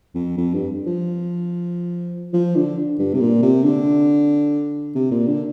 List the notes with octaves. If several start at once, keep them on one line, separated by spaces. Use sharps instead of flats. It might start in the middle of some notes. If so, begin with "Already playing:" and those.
F2
F2
G2
F3
F3
D3
G2
C3
A#2
C3
D3
C3
A#2
D3